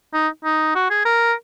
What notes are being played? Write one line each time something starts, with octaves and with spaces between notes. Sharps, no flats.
D#4
D#4
F#4
G#4
A#4